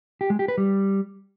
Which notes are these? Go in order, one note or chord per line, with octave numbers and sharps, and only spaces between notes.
G4
G#3
G4
B4
G3